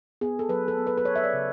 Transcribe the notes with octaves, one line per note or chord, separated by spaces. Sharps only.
B3 G#4
A4
F#3 B4
A4
B3
B4
B4
B3 C#5
E5
D5
C#3